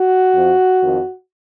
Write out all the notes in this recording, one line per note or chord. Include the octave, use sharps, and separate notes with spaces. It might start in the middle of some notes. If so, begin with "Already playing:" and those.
Already playing: F#4
F2 F3
F2 D#3